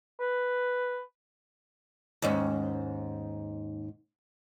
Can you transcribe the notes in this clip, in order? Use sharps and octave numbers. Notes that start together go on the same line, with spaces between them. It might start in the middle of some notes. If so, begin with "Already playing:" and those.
B4
D#2 G#2 C#4